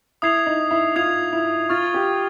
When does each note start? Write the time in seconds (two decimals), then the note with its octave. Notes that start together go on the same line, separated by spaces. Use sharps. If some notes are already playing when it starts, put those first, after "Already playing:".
0.22 E4 D#6 G#6 C7 F7
0.46 D#4
0.71 E4
0.96 F4 D#6 G#6 C7 F7
1.33 E4
1.69 F4 C#6 F6 A6
1.94 G4